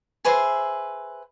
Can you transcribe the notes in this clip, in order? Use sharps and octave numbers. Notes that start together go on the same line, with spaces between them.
G#4 B4 C5 E5